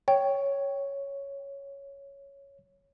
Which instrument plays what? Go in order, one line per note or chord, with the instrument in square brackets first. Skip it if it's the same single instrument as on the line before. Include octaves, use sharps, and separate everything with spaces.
[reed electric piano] C#5 [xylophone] G5